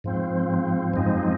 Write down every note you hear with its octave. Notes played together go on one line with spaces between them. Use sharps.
G#2 F3 C4
F#2 F3 G#3 C4 D#4